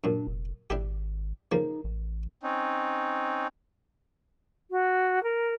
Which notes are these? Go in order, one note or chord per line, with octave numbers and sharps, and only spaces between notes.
F#2 A#2 D4
F1
G#1 D4 E4 G4
C#3 F3 A#3 D#4
A1
C4 C#4 D#4
F#4
A#4